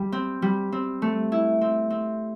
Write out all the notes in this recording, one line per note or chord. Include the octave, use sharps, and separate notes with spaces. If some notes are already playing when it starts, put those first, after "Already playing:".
Already playing: G3
C4
G3
C4
A3
E4
C4
C4